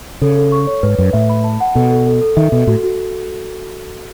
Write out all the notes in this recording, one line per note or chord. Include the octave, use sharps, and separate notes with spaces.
C#3 A4
A4
C#6
C#5
G#2 B4
F#2 B4
A2 E5
B5
A5
F#5
B2 A4
A4
A4
A4
D#3 E5
B2 A4
A2 F#4
F#4